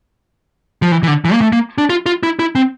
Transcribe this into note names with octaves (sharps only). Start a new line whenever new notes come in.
F3
E3
E3
D3
E3
A#3
A3
A#3
D4
F4
F4
E4
E4
C4